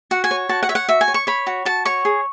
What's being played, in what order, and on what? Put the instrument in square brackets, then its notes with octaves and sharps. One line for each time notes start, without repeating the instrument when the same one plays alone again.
[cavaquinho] F#4 F#5
G#5
C#5
F#4 A5
F#5
C#5 E5
F#5
F#4 E5
G#5
C#5
C#6
C#5 B5
F#4
F#4 A5
C#5 C#6
G#4